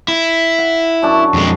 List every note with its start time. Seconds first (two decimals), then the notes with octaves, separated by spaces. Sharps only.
0.08 E4
0.58 F#5
1.02 F#2 D4 A5
1.34 F2 G#3